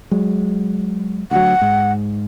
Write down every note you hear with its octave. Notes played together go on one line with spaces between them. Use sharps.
F#3 G#3
D2 F#3 F#5
G#2